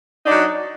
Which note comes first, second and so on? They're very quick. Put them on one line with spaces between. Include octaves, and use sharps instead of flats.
D#4 D4 F#3